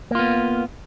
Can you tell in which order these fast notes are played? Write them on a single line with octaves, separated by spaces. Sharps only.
A#3 F4 B3